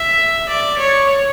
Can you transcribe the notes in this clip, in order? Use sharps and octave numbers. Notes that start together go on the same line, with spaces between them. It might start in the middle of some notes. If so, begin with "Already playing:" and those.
Already playing: E5
D5
C#5